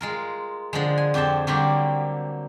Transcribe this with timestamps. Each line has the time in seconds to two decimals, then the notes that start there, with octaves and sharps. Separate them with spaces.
0.01 G#3 F4 A#4
0.73 D3 F3 G#3
0.98 G#5
1.14 F2 G4 A4 C5 A5
1.47 D3 F#3 G3 A#3 C4 G4